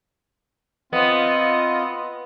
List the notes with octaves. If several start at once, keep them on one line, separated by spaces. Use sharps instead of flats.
B3 C4 F4 D#5